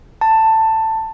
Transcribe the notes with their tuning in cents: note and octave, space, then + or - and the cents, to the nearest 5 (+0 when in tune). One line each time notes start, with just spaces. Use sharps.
A5 +15